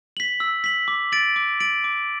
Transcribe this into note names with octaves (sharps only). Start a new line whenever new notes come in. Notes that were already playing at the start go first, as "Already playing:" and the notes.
B6 F#7
E6
B6 F#7
D6
A6 D7 F#7
D6
A6 D7 F#7
D6